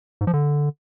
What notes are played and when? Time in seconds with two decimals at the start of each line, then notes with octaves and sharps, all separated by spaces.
0.21 G#2
0.27 F3
0.33 D3